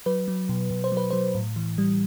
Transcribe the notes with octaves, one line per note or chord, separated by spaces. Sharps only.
F#3 B4
F#3
B2
B2
C5
F#3
B4
F#3 C5
A2
E3
G3